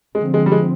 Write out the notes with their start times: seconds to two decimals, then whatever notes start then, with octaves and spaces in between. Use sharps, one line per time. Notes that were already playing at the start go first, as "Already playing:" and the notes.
0.15 D3 F3 G#3 C4
0.34 G#3
0.46 G3
0.52 G#3